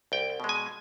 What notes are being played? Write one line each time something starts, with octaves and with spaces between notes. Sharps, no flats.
C2 G5
B2 G#3
G#5